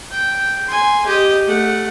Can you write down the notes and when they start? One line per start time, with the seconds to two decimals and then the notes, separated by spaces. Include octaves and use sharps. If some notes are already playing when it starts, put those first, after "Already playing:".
0.11 G5
0.67 G#5 C6
1.06 G4 D#5
1.46 A3 F#5